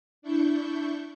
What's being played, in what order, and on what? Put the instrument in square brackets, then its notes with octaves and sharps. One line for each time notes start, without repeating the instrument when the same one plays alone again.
[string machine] D4 E4 C#6 G6